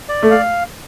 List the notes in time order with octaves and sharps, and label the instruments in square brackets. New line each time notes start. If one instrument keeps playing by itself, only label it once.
[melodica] D5
[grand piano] A3
[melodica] F5